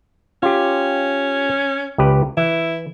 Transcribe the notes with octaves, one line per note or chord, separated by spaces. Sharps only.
C#4 F4 G4
C#2 G4 B4
E3 E4